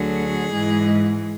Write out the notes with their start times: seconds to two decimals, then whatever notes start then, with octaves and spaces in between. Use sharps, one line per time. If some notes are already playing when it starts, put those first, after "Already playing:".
Already playing: D2 D3 F#3 G#4
0.53 G#2 E3 G#3